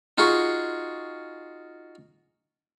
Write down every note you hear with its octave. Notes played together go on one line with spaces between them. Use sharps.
D#4 F4 F#4 G#4 C#6